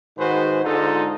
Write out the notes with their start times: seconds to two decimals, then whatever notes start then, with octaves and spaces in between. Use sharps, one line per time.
0.18 G#2 D#3 F#4 G#4 B4 C5
0.64 G#2 D3 G#3 D#4 F4 A4